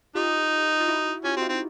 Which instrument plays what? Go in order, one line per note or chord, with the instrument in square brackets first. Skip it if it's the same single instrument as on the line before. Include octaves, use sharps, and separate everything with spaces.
[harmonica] D#4 [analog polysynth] F4 G4
[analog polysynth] F4
E4 F#4
[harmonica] C#4 [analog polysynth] F4 G4
[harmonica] C4 [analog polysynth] F#4
[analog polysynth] D#4 F4
[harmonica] C4